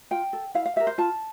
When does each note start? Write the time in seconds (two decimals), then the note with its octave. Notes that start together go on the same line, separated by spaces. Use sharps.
0.11 F4 G5
0.33 A4
0.54 E4 F5
0.66 F5
0.76 G4 A#4 E5
0.87 C5
0.98 F4 A5